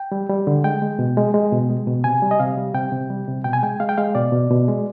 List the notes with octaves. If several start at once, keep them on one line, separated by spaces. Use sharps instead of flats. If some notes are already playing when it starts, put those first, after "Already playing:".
Already playing: G5
G3
G3
D3
G#3 G5
G#3
B2
G#3
G#3
B2
G#3
B2
C3 G#5
G3
D#5
C3 F5
G3
C3 G5
C3
G3
C3
B2 G5
G#5
G#3 G5
G#3 F5
G5
G#3 F5
B2 D5
B2
B2
G#3